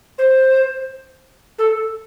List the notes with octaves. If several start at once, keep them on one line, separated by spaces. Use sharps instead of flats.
C5
A4